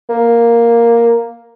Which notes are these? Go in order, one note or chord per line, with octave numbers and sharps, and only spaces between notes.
A#3